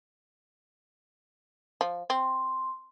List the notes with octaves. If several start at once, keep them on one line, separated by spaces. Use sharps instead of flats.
F3
C4 C6